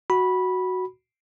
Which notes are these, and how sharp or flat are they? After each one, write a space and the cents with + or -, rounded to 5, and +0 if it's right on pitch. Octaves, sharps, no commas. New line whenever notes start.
F#4 +0 B5 -10